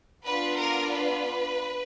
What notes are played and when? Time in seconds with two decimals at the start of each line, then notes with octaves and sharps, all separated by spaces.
0.25 B3 D4 F4 B4
0.58 A#4
0.92 B4